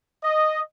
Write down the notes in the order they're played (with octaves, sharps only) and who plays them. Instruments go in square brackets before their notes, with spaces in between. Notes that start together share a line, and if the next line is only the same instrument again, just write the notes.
[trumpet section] D#5